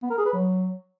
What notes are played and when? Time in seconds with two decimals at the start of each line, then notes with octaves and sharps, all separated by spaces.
0.03 B3
0.10 A#4
0.18 G#4
0.26 B4
0.33 F#3